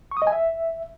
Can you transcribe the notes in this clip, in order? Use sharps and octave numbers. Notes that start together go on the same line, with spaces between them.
C#6
D#6
D#5
G#5
E5